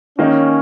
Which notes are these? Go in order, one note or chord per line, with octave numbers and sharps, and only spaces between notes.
D#3 A#3 C#4 D#4